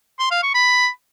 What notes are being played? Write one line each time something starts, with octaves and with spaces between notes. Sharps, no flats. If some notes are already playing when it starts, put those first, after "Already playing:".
C6
F5
C#6
B5